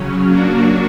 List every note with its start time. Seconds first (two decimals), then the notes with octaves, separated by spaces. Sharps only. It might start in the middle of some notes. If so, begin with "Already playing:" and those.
Already playing: C#3 F#3 C#4
0.25 F#3 A#3 D4 F#4